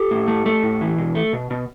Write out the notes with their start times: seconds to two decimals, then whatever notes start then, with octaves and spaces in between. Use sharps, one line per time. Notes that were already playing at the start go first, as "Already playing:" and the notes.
Already playing: G4 A4
0.11 A2
0.28 A3
0.46 A3
0.63 A2
0.81 E3
0.98 B2
1.15 A3
1.33 B2
1.51 B2